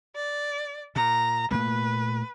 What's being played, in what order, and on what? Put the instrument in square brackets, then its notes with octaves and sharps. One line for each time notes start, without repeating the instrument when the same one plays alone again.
[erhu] D5
[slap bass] A#2 [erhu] A#5
[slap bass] A#2 A3 A#3 [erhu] B4